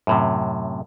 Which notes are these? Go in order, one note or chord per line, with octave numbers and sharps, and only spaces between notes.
F#2 A2 C3